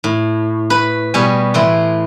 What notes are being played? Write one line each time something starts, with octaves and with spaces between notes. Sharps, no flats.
A2
B4 B5
B2 G3 C#5 G#5
A2 E3 E4 C6